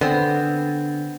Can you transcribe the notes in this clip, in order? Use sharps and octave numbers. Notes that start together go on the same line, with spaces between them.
D3 B3 C4